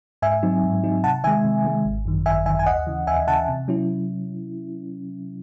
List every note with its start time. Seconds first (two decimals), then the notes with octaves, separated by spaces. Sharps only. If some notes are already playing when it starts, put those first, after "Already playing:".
0.22 G#2 E5 G#5
0.43 F#3 C4 D#4
0.63 G#2
0.83 F#3 C4 D#4
1.04 C3 F#5 A5
1.24 D#3 G#3 E5 G#5
1.44 C3
1.65 D#3 G#3
1.85 G#1
2.06 F#2 D#3
2.26 G#1 E5 G#5
2.46 D#3 E5 G#5
2.49 F#2
2.59 G#5
2.66 D#2 D#5 F#5
2.87 C#3 E3
3.07 D#2 E5 G#5
3.27 C#3 E3 F#5 A5
3.48 C3
3.68 F#3 C#4 E4